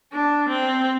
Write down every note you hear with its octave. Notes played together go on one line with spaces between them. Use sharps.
D4
C4